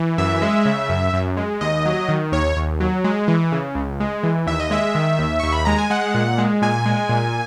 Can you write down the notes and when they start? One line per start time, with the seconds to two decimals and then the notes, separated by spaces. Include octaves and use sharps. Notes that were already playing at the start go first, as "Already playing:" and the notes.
Already playing: E3
0.18 F#2 E5
0.42 G#3
0.65 C#3
0.89 F#2
1.13 F#2
1.37 G#3
1.61 D#2 D#5
1.86 F#3
2.09 D#3
2.32 D#2 C#5
2.56 D#2
2.80 F#3
3.04 G#3
3.28 E3
3.52 C#3
3.75 C#2
4.00 G#3
4.23 E3
4.47 D#2 E5
4.60 D#5
4.71 G#3 E5
4.95 D#3
5.19 D#2
5.40 D#2 C#6
5.52 B5
5.65 G#3 A#5
5.78 G#5
5.90 G#3 F#5
6.14 A#2
6.38 G#3
6.62 A#2 G#5
6.86 G#3
7.09 A#2